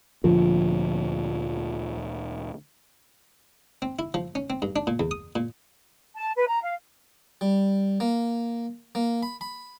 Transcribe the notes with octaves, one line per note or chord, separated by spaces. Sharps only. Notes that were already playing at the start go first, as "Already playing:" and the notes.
D2 A#2 D3 F3
C4
E4
F3
C#4
C4
G2
D4
A#2
E2
D#6
A#2
A5
B4
A#5
F5
G3
A#3
A#3
B5
B5